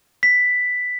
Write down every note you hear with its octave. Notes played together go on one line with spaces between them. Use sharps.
B6